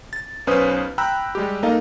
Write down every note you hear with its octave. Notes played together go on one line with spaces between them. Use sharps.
A6
B1 C#4 B4 C5 D#6
G5 A#5 B5 E6 F#6
G3 G#3 G4
A#3 D#4 A4 D#5 F5